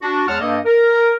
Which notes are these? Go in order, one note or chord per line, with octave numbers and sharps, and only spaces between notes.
D4 F#4
E2 G#3 C#5 F#5 A5 F6
G2 A#3 A4 D#5
A#4